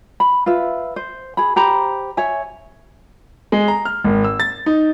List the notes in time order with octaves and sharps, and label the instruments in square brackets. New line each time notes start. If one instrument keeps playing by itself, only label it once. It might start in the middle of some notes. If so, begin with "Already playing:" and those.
[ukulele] B5
F4 B4 E5
C5
G#4 B5
G4 C5 A#5 B5
C#5 E5 G#5
[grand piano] G#3
A#5
F6
G#1
E6
A6
D#4